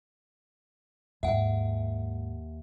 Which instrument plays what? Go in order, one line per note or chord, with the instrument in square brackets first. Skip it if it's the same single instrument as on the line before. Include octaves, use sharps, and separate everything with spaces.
[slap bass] D#2 [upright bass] G#2 G#3 [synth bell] E5 F#5